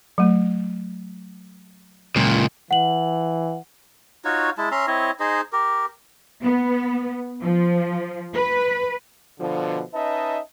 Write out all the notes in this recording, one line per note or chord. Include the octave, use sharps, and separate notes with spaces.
F#3 A3
C#2 A#2
E3 F#5 F#7
D#4 F4 F#4 C#5
G#3 E4 A5
C#4 E5 A#5 C6
C4 E4 C#5 D#5
D#4 G#4 C5 D#5
G4 A#4
B3
F3
B4
B2 D3 F3
C#4 D#4 B4 D#5 E5 A5